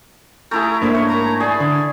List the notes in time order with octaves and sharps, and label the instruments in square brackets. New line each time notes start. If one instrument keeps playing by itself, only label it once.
[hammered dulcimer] A3 E4 G#4 [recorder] A#5
[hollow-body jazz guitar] G#2 A#3 D4 [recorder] E5
[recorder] A#4 [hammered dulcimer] C#5
[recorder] A#5
[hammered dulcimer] G#4 [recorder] D5
[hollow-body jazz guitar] D3